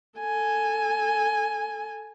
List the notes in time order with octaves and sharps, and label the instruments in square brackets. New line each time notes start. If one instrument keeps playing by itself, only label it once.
[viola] A4 G#5